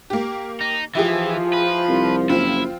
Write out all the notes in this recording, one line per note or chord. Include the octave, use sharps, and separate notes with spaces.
A#3 G4
D#4
E3 F3 E4 G4 G#4
B4
C2
F#1 C4 E4 F4